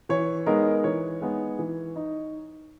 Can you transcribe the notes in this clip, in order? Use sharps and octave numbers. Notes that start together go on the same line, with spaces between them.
E3 C#5
G#3 B3 D#4 A#4
E3 C#5
G#3 B3 D#4
E3
D#4